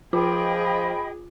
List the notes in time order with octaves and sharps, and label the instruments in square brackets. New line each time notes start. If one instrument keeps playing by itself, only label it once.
[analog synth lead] F3 [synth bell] F4 [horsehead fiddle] G#4 [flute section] D#5 G5 B5